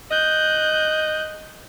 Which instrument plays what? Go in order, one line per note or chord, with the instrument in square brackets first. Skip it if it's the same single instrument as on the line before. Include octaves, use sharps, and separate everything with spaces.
[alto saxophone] D#5 [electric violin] F#6 G6